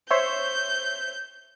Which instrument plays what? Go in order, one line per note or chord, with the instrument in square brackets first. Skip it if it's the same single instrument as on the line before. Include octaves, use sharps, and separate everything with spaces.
[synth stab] C5 C#5 E5 [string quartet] G6